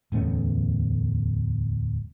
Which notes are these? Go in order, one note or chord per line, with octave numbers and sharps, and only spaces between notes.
D1 E2 A3 C#4